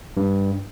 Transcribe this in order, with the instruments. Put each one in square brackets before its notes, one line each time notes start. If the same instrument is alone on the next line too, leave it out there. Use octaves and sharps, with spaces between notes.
[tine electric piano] G2